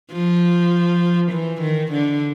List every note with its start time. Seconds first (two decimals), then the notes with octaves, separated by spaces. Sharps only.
0.12 F3
1.32 E3
1.61 D#3
1.92 D3